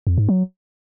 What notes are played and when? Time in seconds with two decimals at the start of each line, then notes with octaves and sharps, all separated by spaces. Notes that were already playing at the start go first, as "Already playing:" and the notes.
0.07 F2
0.18 G#2
0.29 F#3